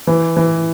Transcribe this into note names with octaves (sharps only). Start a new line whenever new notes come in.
E3
E3